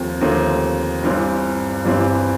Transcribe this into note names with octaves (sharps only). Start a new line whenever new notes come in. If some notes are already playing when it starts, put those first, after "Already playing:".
Already playing: D#2 F3 A3 C4
D#2 D3 F3 A3 C4
G1 G2 E3 G3 C4
G1 G2 E3 G3 C4